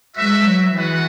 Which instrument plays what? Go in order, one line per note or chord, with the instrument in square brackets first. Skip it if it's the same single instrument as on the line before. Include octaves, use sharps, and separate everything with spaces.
[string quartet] G#3 [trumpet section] F#4 B4 E5
[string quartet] F#3
[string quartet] E3 [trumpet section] G#3 B3 F#4 B4 F#5